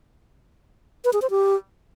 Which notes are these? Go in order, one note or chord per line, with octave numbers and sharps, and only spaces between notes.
B4
G#4
C5
G4